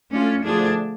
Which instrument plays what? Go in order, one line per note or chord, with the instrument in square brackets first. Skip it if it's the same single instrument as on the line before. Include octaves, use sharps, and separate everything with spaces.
[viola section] A3 D4 F4 [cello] C#4
[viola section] D3 F3 A3 F4 G#4 [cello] D4